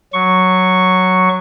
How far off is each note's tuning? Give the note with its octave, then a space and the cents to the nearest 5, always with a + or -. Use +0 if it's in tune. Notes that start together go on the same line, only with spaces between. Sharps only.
F#3 +0 C#6 +0